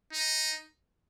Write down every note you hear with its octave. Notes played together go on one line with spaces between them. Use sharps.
D#4